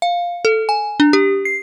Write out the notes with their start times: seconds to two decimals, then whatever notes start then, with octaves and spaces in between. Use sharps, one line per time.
0.02 F5
0.45 A4
0.69 G#5
1.00 D4
1.13 G4
1.45 C7